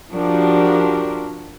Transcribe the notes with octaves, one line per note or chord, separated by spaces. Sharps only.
F3 D4 F#4 G4 A#4